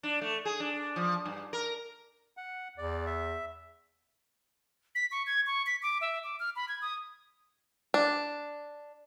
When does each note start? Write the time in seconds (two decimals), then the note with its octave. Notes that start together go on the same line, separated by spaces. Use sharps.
0.03 D4
0.22 A3
0.45 G#4
0.60 D4
0.96 F3
1.26 G2
1.53 A#4
2.37 F#5
2.78 E2 D5
3.06 E5
4.95 B6
5.12 C#6
5.27 G#6
5.47 C#6
5.67 B6
5.82 D6
6.01 E5
6.24 D6
6.40 F6
6.56 B5
6.69 G#6
6.82 D#6
7.94 D4